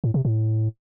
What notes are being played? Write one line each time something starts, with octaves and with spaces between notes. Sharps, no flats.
A2
C3
A2